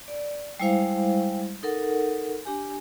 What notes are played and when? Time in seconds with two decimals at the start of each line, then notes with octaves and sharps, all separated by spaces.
0.08 D5
0.60 G3 G#3 E4 C5 F5
1.63 D#4 A4 A#4 F#5
2.45 D4 G4 G#5